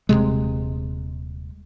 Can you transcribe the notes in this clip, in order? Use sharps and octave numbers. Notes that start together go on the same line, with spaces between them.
D#1 E2 C3 G#3